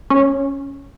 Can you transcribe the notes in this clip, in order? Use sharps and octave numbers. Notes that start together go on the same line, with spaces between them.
C#4